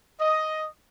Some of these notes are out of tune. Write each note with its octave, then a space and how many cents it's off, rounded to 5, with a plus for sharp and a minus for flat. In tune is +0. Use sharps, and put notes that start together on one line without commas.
D#5 +5